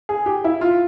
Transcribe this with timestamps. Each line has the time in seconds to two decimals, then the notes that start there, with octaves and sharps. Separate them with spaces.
0.09 G#4
0.26 G4
0.44 E4
0.61 F4